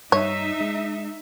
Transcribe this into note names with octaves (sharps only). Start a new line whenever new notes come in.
G2 G3 D#4 C#5 E5
G#3